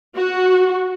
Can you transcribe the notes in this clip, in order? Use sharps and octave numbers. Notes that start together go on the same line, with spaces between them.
F#4